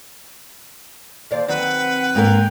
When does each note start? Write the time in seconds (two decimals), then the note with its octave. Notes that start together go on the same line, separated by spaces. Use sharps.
1.31 D#2 C5 D5 F5
1.48 D#3 F#3 C4 B4 F#5
2.15 G#2 A#3 A#4 G5